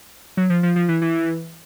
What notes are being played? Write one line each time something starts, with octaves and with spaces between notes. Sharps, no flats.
F#3
F3
F3
F3
E3
E3